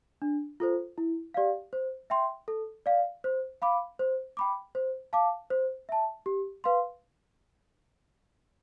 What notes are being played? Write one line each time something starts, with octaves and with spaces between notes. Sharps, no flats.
D4
F4 A4 C5
E4
G4 D5 F5
C5
E5 G5 C6
A4
D5 F5
C5
F5 B5 D6
C5
G5 B5 D6
C5
F5 A5 D6
C5
E5 A5
G4
B4 F5 C6